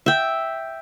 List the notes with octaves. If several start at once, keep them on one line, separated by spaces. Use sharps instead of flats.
E5 G5